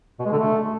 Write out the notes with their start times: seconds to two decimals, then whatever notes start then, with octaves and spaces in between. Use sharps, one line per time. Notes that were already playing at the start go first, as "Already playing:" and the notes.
0.19 B2
0.26 G#3
0.32 D3
0.38 A3